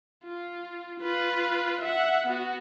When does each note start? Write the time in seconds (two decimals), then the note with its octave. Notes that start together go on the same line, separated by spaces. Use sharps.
0.25 F4
1.00 F4 B4
1.82 E5 F#5
2.27 B3 F#4